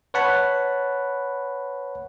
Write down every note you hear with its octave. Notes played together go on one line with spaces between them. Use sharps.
B4 C#5 F#5 A5 B5